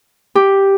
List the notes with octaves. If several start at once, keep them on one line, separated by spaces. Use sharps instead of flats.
G4